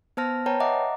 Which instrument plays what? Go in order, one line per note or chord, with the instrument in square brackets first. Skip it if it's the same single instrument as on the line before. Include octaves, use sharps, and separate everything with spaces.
[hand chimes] B3 C5 A5 F6 A#6
B4 C#5 G5 A5 A#5
D#5 E5 F#5 A#5 D6